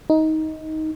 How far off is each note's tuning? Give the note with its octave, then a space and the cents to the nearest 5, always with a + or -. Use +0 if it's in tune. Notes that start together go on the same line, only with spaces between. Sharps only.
D#4 +15